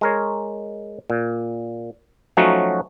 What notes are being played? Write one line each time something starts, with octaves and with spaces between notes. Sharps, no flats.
G#3 A#4 C#5
A#2
F3 F#3 A3 C#4 D#4 F#4